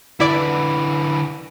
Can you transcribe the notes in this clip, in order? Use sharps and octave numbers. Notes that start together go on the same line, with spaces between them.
D3 E3 E4 B4 D5 B5